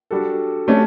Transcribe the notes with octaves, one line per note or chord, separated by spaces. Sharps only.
G3 D4 F#4 A4
G3 A3 C#4 D4 F#4 A4